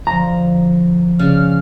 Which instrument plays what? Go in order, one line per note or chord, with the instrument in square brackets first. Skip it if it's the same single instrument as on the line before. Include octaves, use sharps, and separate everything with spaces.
[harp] F2 D3 F3 [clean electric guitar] A#5
[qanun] C#3 [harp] D5 [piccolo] F6